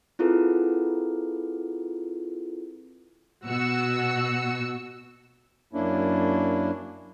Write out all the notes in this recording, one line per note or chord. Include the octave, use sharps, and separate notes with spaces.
C4 E4 F4 G#4 A4 B4
B2 F#4 E6 C#7
F#2 A#3 C#4 D4 E4